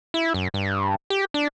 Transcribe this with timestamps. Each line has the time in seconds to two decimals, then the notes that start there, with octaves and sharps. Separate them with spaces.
0.14 E4
0.34 F#2
0.54 G2
1.10 G4
1.34 D4